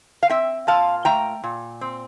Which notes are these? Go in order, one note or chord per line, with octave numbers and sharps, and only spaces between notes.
F5
C4 E5 G5
A#2 F5 A5
A3 G5 A#5
A#2
C4